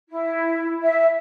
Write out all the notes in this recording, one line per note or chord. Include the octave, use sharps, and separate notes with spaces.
E4
E5